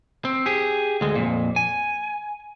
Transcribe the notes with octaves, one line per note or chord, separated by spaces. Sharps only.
C4
G4 G#4
D2 G#3
F2 A#2
G#5